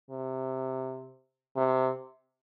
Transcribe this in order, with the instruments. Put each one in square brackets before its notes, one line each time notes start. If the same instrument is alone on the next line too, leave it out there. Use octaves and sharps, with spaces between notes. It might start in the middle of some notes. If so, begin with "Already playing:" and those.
[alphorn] C3
C3